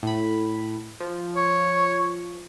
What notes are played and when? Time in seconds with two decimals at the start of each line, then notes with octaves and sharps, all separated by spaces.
0.03 A2 B5
1.00 F3
1.36 C#5